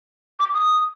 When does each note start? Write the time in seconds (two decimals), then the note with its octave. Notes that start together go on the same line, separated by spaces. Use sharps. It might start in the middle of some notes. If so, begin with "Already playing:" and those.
0.39 D6
0.54 D#6